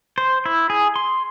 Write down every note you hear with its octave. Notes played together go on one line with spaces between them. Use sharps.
C5
E4
G#4
C6